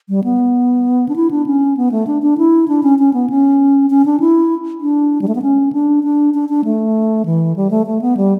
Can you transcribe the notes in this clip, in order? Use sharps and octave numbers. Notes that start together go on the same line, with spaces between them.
G3
B3
D4
E4
D4
C#4
B3
A3
D4
D4
E4
D4
C#4
C#4
B3
C#4
C#4
D4
E4
D4
G3
A3
B3
C#4
D4
D4
D4
D4
A3
E3
G3
A3
A3
B3
G3